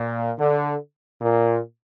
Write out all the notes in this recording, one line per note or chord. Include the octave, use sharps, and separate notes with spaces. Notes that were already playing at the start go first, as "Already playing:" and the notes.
Already playing: A#2
D3
A#2